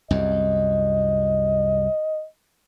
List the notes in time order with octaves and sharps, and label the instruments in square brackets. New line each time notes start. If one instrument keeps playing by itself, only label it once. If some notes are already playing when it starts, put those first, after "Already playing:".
[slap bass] C2 F#2 [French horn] D#5